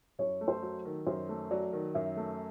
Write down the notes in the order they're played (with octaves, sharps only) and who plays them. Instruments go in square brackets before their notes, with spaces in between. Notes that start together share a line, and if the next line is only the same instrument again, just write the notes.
[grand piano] F#2 [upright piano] C#5
[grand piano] A3
[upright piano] C5
[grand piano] F#3
D#3
[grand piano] F#2 [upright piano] C5
[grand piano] A3
[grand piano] F#3 [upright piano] D5
[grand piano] D#3
[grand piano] F#2 [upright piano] E5
[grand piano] A3